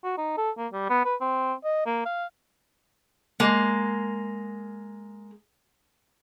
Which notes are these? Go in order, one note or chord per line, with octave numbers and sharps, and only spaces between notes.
F#4
D#4
A4
A#3
G3
B3
B4
C4
D#5
A#3
F5
G#3 A#3